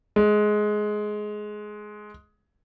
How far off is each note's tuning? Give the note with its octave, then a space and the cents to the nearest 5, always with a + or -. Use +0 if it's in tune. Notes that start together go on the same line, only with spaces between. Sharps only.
G#3 +15